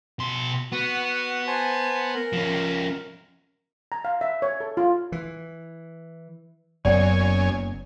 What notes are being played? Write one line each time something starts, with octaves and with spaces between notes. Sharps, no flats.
B2 C6
B3 F#4
C5 G#5 A5
A#4
F3 C#4
A#5
F5
E5
C#5
A4
F4
E3
F#1 F#2 B3 C#5 D5 G5 G#5